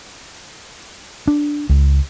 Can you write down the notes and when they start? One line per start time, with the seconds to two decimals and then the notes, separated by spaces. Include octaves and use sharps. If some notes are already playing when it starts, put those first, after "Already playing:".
1.27 D4
1.69 C#2